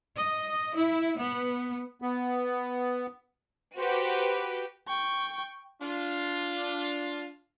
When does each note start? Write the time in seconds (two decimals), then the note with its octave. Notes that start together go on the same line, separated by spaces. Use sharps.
0.16 D#5
0.75 E4
1.18 B3
2.02 B3
3.77 F#4 G4 B4 C5
4.88 G5 C#6
5.82 D4 F4